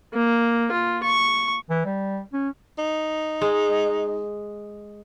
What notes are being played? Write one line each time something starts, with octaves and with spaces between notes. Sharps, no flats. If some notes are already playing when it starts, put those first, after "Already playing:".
A#3
F4
C#6
E3
G3
C#4
D#4
G#3